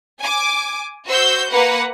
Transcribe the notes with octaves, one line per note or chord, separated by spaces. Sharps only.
G#5 D6
F#4 C5 E6 G6
A#3 B4 F#5